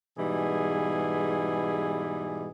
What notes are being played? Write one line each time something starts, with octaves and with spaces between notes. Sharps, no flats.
G#2 B2 E3 G3 G#4